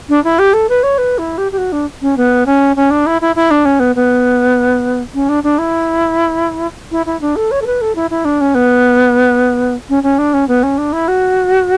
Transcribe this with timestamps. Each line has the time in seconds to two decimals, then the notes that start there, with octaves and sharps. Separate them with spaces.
0.09 D4
0.24 E4
0.39 G4
0.53 A4
0.69 B4
0.83 C#5
0.98 B4
1.18 E4
1.38 G4
1.52 G4
1.58 F#4
1.72 D4
2.02 C#4
2.17 B3
2.46 C#4
2.76 C#4
2.91 D4
3.06 E4
3.21 E4
3.36 E4
3.51 D4
3.65 C#4
3.80 B3
3.95 B3
5.14 C#4
5.29 D4
5.43 D4
5.58 E4
6.91 E4
7.06 E4
7.21 D4
7.36 A4
7.51 C#5
7.62 A4
7.66 B4
7.81 A4
7.95 E4
8.10 E4
8.25 D4
8.41 C#4
8.55 B3
9.89 C#4
10.03 C#4
10.18 D4
10.34 C#4
10.48 B3
10.63 C#4
10.78 D4
10.93 E4
11.08 F#4